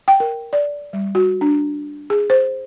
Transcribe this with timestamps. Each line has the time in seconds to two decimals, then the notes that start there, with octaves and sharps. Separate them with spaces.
0.08 G5
0.20 A#4
0.53 D5
0.93 G3
1.15 F#4
1.41 D4
2.10 G#4
2.30 C5